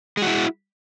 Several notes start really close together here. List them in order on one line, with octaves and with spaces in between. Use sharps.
G#3 F#4 E4